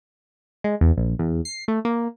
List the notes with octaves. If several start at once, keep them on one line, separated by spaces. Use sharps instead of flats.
G#3
E2
A#1
E2
C7
A3
A#3